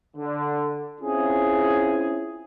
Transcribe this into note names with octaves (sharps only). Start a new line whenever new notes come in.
D3
C4 C#4 E4 F4 G#4